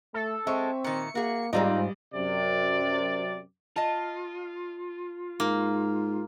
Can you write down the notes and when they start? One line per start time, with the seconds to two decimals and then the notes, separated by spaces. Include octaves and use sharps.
0.14 A3 A4
0.47 G#3 C4 E5 C#6
0.84 A#2 D#3 C#7
1.15 A#3 F#4 G#4
1.53 G#2 G3 A#3 C4 D#4 F4 D5 D#5
2.14 F#2 C3 D5
3.76 F4 D#5 A5
5.40 G#2 A#3